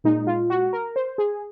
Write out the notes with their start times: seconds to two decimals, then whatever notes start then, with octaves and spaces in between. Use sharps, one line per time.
0.04 A#2 G#3 D#4
0.27 F4
0.50 F#4
0.73 A#4
0.96 C5
1.18 G#4